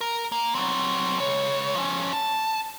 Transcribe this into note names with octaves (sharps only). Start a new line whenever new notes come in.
A#4
A#3
F#3 C4
C#2 C#5
F3 C#4
A5